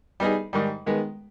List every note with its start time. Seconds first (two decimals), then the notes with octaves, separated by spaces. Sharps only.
0.20 G3 B3 D#4 G#4
0.53 G#2 D#3 G3
0.86 D#3 G#3 B3